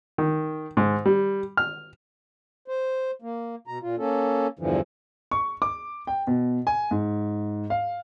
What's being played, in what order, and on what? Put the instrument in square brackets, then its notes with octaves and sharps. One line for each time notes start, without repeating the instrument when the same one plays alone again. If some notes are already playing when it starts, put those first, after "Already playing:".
[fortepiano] D#3
G#2
G3
F6
[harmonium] C5
A#3
B2 A#5
A#2 F4
A#3 C#4 A4
E2 G2 D3 E3 F3
[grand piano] C#6
D6
G5
B2
G#5
G#2
F5